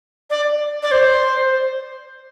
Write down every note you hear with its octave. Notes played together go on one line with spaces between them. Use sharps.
D5
D5
C5